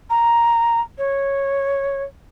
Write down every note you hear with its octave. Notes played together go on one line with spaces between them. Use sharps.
A#5
C#5